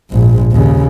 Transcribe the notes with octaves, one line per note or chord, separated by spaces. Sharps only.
A#1 G#2
D#2 C#3